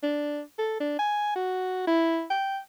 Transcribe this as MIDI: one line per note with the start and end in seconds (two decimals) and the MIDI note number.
0.03 0.42 62
0.59 0.77 69
0.80 0.98 62
0.99 1.32 80
1.36 1.83 66
1.87 2.25 64
2.30 2.59 79